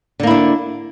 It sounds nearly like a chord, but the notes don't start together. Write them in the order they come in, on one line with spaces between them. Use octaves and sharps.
D3 A#3 E4 D4